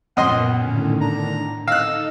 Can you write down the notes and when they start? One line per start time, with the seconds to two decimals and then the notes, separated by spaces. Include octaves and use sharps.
0.17 C#2 F#2 A#2 B3 D#5 F#5 C6
0.59 A2 D3 D#3 C#4
1.01 D4 A#5
1.68 D#4 A4 D#5 F5 E6 F#6